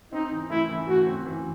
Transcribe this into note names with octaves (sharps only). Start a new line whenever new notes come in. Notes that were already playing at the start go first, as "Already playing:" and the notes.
C4 D#4
E3
A3 E4
E3
A3 F#4
C4
E3